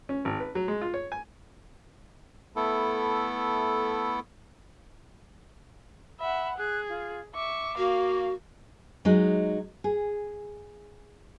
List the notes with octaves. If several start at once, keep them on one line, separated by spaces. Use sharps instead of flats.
C#4
G#1
B4
F#3
G#3
F4
C#5
G#5
A3 B3 E4 A4
E5 F#5 B5
G#4 F#6
F4
E5 C#6 D6
A#3 F#4 F5
F#3 G#3 D#4
G#4